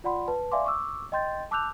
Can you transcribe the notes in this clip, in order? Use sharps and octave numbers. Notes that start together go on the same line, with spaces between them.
F4 D5 F#5 B5 C6
B4 A5
D5 E5 F5 G#5 C6 D6
C#6 D6 E6
D#5 G5 C6 G6 A6
A5 D6 E6 F#6 G6 F7